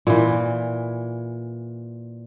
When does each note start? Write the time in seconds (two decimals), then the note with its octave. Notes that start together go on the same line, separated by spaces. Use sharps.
0.07 A#2 E3